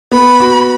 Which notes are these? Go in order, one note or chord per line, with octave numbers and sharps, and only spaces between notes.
B3 B5
F#4